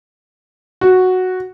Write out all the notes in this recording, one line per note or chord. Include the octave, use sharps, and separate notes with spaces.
F#4